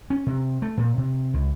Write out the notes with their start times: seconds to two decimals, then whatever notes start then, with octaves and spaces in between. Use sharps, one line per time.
0.10 C#4
0.27 C3
0.62 A3
0.77 A#2
0.98 C3
1.34 C#2